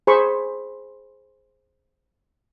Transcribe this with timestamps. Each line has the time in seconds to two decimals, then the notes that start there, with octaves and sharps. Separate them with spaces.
0.07 G#4 C5 B5 C#6